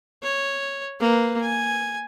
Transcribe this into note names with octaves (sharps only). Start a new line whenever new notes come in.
C#5
A#3 B4
G#5